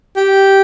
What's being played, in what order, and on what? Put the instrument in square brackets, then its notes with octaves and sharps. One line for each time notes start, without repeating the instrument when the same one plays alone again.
[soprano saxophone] G4